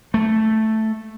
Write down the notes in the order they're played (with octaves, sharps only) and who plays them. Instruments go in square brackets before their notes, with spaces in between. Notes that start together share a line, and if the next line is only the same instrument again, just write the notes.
[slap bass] A3